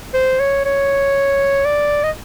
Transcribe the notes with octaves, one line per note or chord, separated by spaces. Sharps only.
C5
C#5
C#5
D5
D#5